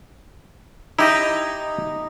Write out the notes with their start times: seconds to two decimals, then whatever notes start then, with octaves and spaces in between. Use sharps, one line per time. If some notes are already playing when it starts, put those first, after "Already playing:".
0.99 D#4 E4 G4 D#5